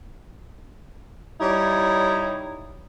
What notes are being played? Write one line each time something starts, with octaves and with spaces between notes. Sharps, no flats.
G3 D#4 E4 C#5